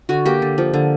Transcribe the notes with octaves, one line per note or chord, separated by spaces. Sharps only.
D3 F#4
A#3 G4
D3
F3
D3